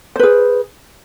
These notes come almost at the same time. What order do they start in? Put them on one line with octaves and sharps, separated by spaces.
C5 B4 G#4